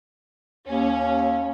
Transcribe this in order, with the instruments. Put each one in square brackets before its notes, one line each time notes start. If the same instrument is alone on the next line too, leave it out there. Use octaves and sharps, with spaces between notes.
[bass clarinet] D#2 [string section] C#4